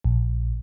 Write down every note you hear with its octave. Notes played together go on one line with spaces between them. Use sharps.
A#1